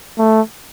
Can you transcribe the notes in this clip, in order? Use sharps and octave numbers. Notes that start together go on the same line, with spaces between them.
A3